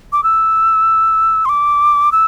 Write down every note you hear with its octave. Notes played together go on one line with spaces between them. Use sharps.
D6
E6
C6
D6
E6